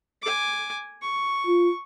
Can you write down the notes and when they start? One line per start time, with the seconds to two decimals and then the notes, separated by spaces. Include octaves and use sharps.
0.22 G#5 D6
1.02 C#6
1.47 F4